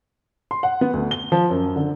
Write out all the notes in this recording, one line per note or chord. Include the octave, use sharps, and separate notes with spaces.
C6
F#5
B3
D2
G7
F3
F#2
D3